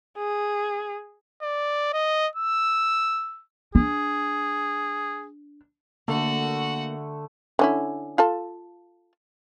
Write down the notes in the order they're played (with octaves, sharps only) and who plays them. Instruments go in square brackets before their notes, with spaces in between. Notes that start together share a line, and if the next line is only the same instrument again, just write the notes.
[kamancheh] G#4
[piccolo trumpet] D5
D#5
E6
[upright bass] D4 [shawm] G#4
[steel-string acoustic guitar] D3 [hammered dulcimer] A3 [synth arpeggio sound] A#3 [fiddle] F#4 F#5
[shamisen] D3 C#4 E4
F4 A4 A5